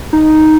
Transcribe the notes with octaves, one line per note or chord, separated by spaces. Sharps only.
D#4